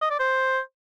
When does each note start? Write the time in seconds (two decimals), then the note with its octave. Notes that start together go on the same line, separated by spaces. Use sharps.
0.01 D#5
0.10 D5
0.19 C5